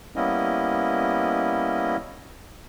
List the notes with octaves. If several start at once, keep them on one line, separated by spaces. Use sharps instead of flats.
G3 A#3 B3 C#4 E4 D#5